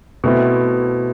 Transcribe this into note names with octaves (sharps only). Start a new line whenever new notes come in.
B2 A3 C4 E4